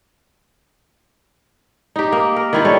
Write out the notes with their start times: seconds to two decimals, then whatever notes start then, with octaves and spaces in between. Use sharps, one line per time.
1.96 D#4 G4
2.12 A#3
2.36 A#4
2.53 D#3 E4 F4
2.65 G3 A3 C#5